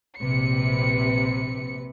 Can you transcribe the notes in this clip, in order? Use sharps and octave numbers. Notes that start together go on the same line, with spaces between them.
A#1 C3 B4 C#7